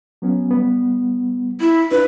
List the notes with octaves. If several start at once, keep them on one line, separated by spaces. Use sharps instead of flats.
F#3 B3 C#4
G3 B3
E4
D4 F4 B4